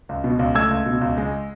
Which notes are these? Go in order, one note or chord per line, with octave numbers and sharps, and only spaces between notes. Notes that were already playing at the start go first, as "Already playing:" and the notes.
C#2
B2
C#2
A3 E6 G#6
C#2
B2
C#2
G#3